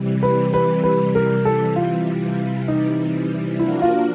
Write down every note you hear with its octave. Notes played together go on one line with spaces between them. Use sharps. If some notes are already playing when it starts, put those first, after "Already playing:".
Already playing: C3 E3 G3
B4
B4
B4
A#4
A4
F4
D#4
F3 A#3 D4 E4 F#4 A#4
F4